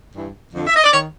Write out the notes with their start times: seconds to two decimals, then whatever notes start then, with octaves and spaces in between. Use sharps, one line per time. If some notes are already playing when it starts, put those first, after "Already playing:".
0.13 G2 E3
0.53 F2 D3 F3
0.66 E5
0.75 D#5
0.84 D5
0.92 D#3 C#5